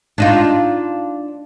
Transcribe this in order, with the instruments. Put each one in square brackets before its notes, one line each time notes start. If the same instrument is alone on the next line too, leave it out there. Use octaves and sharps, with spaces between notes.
[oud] D4 D#4 F4